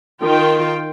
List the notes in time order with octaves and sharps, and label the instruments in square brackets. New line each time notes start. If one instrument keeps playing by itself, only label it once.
[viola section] D#3 F4 G5